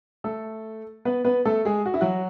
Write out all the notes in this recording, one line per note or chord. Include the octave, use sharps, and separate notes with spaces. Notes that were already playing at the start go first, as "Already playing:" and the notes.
A3 A4
B3 B4
B3 B4
A3 A4
G#3 G#4
F#4
E4
F#3 F#4